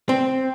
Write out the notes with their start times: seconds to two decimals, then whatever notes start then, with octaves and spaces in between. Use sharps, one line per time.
0.09 C4